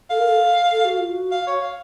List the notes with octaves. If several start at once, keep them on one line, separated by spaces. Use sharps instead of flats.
A4 F5
A#4
A4
A4
F#4
F4
F#4
F5
C#5
F5